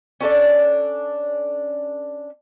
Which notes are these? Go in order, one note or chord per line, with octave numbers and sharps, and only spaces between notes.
C#4 D4 A4 D5